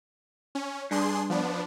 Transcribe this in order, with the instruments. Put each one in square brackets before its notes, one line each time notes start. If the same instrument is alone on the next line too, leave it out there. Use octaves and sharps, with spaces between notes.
[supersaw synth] C#4
[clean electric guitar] G2 [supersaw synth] D4 G#4 C6
[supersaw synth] F3 B3 D4